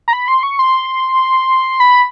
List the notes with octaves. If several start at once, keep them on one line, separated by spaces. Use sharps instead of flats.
A#5
B5
C6
C#6
C6
B5